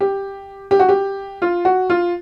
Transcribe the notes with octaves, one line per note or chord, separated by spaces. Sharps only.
G4
G4
F#4
G4
F4
F#4
F4